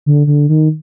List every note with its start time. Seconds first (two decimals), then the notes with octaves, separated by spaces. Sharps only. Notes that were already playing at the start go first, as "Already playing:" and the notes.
0.06 D3
0.27 D3
0.49 D#3